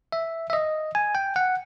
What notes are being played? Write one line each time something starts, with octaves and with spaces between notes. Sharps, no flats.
E5
E5
D#5
G#5
G5
F#5